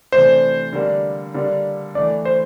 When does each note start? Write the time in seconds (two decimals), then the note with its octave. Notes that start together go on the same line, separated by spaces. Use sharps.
0.12 C3 E3 A3 D4 C5
0.73 D3 G3 A#3 D4
1.34 D3 G3 A#3 D4
1.95 E3 A3 D4 D5
2.25 C5